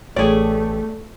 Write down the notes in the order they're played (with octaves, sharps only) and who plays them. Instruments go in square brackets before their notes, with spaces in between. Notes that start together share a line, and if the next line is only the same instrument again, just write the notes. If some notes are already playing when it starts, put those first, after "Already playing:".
[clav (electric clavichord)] A1 G4 C#5 [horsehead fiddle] A3 [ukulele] G#4 D5